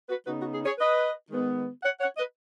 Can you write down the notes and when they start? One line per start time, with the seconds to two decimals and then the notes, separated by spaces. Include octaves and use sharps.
0.09 F#4 B4
0.26 C#3 B3 D#4 F#4 B4
0.39 F#4
0.53 G#4
0.65 G#4 C#5
0.79 B4 D#5
1.31 D#3 G#3 B3
1.83 C#5 F#5
2.00 C#5 F#5
2.17 B4 D#5